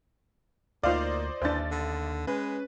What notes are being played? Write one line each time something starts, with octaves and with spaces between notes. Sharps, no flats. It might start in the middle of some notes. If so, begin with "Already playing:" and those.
D2 A#3 D#4 F4 C5 D5 F5
A1 D#2 E3 D4 C5 A6
D3
G#3 C#4 B4